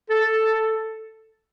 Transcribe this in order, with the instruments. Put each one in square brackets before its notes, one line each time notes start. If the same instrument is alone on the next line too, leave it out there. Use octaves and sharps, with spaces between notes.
[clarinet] A4